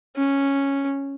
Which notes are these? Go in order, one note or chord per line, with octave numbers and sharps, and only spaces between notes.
C#4